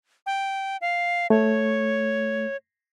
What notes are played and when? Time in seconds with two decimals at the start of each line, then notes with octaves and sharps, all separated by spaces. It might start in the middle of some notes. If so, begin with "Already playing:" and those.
0.26 G5
0.81 F5
1.30 A3 C#5